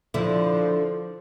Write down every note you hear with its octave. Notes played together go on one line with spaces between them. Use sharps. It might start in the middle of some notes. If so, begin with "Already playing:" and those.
D3 F3 E4